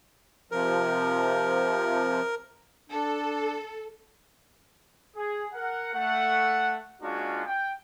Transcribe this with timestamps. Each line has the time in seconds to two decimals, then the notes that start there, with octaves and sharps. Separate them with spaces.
0.51 C3 F3 A#4
2.90 D4 A4
5.16 G#4
5.54 A#4 F#5
5.94 A3 F#5
7.02 G#3 A#3 C#4 D4 F4 F#4
7.46 G5